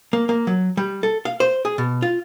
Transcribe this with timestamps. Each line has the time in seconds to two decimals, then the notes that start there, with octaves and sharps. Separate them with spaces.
0.13 A#3
0.29 A#3
0.47 F#3
0.77 G3
1.03 A4
1.25 F5
1.40 C5
1.65 G#4
1.78 B2
2.02 F4